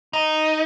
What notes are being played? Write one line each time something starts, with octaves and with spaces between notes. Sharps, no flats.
D#4